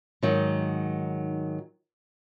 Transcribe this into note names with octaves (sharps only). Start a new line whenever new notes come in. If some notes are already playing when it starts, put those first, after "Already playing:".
G#2 D#3 F#3